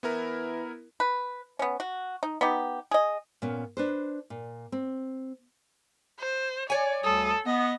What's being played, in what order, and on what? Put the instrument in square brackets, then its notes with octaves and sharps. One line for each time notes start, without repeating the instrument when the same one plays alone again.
[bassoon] E3 [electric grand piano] B3 E4 A#4
[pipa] B4
B3 C#4
F#4
D#4
B3 D#4 G4
G#4 D#5
[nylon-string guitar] A#2 B3 C#4
D4 B4 C5
A#2
C4
[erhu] C5
[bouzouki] C#5 G#5 [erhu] D5
[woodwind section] D2 G3 D#6 [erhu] A4
[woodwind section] B3 [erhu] D#5